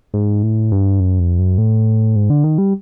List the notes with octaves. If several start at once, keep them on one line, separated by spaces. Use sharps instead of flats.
G#2
A2
G2
F#2
F2
F#2
A2
G#2
D3
D#3
G3